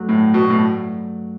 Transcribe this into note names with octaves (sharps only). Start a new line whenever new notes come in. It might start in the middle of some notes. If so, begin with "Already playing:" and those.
Already playing: G2 F#3 A3
A2
B2
A2